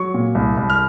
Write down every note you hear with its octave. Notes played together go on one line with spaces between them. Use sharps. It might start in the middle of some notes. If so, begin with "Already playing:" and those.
Already playing: F#3 C#6
A#2
C2
C2
F6